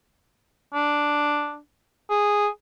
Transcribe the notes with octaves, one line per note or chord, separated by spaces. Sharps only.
D4
G#4